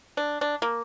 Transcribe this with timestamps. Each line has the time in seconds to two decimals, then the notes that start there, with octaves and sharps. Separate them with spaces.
0.17 D4
0.41 D4
0.62 A#3